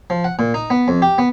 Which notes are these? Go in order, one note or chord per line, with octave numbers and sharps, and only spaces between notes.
F3
F#5
A#2
D#4
B3
F2
G4
B3